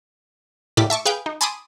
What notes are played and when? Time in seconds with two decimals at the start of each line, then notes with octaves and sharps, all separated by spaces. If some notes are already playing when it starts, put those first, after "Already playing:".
0.77 A2 A3 A#3 G4 D5 B6
0.90 E5 A5 C#6 D6
1.05 G#4 B4 F5 G5
1.26 D#4
1.41 G#5 A5 B5 C6 D6 D#6